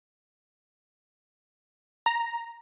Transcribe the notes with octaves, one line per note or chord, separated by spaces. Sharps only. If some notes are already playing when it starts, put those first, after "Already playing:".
A#5